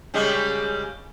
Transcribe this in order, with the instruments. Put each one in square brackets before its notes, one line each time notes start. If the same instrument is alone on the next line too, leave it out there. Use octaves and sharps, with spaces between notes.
[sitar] C#3 G3 G#3